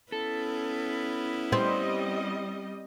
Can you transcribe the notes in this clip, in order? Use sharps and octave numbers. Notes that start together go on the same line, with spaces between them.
B3 C#4 E4 A4
G3 C4 D#5